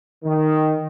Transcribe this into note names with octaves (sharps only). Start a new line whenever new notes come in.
D#3